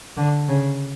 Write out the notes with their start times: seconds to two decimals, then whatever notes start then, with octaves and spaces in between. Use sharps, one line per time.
0.17 D3
0.48 C#3